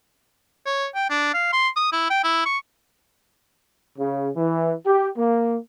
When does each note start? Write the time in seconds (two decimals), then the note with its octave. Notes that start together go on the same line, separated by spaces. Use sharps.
0.66 C#5
0.95 G5
1.10 D4
1.34 F5
1.53 C6
1.76 D#6
1.92 E4
2.10 G5
2.24 E4
2.45 C#6
3.98 C#3
4.35 E3
4.86 G4
5.17 A#3